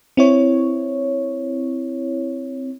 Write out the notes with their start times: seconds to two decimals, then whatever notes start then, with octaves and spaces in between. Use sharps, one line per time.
0.17 C4 E4 C#5